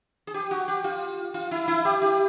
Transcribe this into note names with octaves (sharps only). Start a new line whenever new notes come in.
G#4
G4
F#4
G4
F4
F4
E4
E4
G4
G4